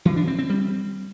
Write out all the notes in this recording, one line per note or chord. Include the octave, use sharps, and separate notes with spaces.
E3
D4
C4
C4
G3